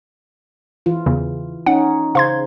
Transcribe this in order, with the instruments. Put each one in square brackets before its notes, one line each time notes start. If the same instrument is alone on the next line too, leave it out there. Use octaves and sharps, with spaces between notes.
[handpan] E3 F4
[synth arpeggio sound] E2 C#3
[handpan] C#4 D#4 [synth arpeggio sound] F#5
[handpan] C#3 C5 [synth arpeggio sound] F5 C6 G#6